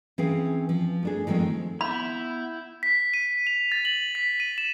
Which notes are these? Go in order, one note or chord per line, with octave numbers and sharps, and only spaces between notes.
E3 C4 C#4 G#4 F5
F3
A3 D4 G#4
D#3 F3 G#3 A3 C4
B3 E4 B5 G6
B6
D#7
F7
A6
F#7
B6
D#7
E7